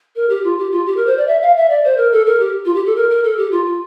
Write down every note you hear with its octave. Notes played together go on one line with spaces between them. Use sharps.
A#4
G4
F4
G4
F4
G4
A#4
C5
D5
E5
F5
E5
D5
C5
A#4
A4
A#4
G4
F4
G4
A4
A#4
A#4
A4
G4
F4
F4